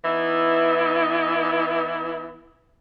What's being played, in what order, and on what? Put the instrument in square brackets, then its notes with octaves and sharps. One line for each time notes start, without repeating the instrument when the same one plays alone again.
[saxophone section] E3 B3 D#4 E4